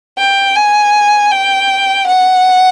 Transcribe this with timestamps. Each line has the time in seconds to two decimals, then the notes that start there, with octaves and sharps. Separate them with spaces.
0.18 G5
0.56 G#5
1.31 G5
2.07 F#5